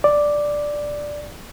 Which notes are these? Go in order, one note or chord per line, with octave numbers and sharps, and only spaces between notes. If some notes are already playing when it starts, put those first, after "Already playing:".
D5